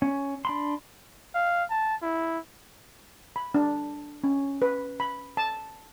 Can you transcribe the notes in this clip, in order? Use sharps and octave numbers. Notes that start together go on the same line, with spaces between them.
C#4
D4 B5 C6
F5
A5
E4
B5
D4
C#4
B4
B5
A5